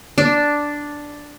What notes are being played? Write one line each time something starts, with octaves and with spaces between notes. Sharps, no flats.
D4